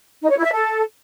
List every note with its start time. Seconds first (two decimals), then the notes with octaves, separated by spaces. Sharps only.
0.22 D#4
0.29 C#5
0.37 E4
0.44 E5
0.52 A4